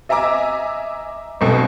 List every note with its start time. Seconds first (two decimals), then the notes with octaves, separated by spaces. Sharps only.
0.09 D#5 E5 G#5 A#5 D6 E6
1.41 B1 G2 B2 C4 A4